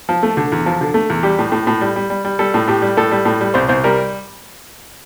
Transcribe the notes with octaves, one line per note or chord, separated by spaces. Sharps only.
F3
A3
D3
E2
F3
D3
A3
E2
G3 G4
A2
A2
A2
G3
G3
G3
G3
G3 A4
A2
A2 G4
G3
A2 A4
G3
A2
G3
C2 C5
C2 C5
G3 A#4